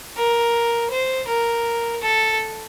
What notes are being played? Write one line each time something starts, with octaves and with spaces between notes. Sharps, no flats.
A#4
C5
A#4
A4